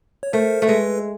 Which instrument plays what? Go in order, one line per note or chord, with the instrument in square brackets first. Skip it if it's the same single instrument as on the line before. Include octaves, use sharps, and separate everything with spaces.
[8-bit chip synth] C#5
[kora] A3 [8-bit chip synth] A#4 C5
[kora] A3
[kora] G#3 [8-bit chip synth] A4 B4